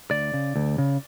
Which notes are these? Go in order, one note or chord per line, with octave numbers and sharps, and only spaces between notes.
D2 D5
C#3
D2
C#3